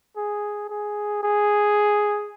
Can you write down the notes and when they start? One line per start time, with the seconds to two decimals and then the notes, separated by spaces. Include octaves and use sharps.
0.17 G#4
0.70 G#4
1.23 G#4